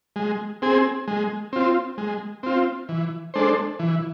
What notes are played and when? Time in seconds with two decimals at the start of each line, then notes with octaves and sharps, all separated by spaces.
0.16 G#3
0.62 C4 G#4
1.08 G#3
1.53 C4 F4
1.98 G#3
2.43 C4 F4
2.89 E3
3.34 G#3 D4 A4 C5
3.79 E3